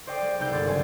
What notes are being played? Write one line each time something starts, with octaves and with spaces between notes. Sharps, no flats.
C5 D5 D#5 G5 D6 C7
G#3
C2 B3 D#4 E6 G6
G1 D#2 D#3 C5 D6 A6
F#1 C4 F#4 C5 G#5